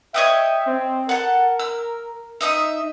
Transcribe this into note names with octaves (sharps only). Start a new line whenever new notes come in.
C#5 D#5 E5 G5
C4
A4 A#4 F#5
E6
D#4 D#5 E5